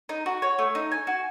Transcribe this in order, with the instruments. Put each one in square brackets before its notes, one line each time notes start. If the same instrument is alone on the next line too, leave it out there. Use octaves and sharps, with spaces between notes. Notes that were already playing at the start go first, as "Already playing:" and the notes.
[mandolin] D#4
F#4
C#5
A3
D#4
G#5
F#4